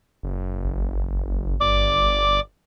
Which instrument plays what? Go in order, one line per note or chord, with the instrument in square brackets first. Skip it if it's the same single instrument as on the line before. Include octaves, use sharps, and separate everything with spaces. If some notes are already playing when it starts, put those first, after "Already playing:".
[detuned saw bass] F#1
[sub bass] G#1
[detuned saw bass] G1 [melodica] D5 D6